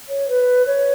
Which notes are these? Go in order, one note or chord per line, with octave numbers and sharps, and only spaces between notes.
C#5
B4
C#5